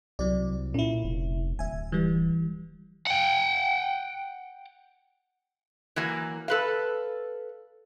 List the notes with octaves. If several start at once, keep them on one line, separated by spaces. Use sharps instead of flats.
C2 F#3 D5
A#2 C#4 E4
F1
D1 E5 G#5
E3 G3
F#5 G5
E3 F#3 A#3
A4 B4 F5